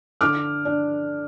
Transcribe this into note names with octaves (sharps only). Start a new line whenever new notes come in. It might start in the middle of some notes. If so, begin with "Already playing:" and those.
D3 D6 F6
D4